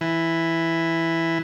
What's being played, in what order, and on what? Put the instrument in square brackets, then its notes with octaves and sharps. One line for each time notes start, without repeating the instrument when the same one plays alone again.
[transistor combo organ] E3